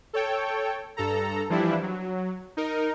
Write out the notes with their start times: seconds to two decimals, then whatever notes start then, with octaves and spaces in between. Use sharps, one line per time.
0.13 A4 C#5 G5
0.97 G2 A4 A#5
1.49 E3 F3 G3 D4 E4
1.83 F#3
2.57 D#4 A#4